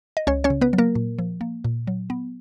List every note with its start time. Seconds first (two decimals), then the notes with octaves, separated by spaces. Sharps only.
0.17 D#5
0.27 C#2 C#4 C#5
0.44 C#4 C#5
0.50 C#3
0.61 B3 B4
0.73 F#3
0.78 A#3 A#4
0.95 A#2
1.19 F3
1.41 A#3
1.65 A#2
1.87 F#3
2.10 B3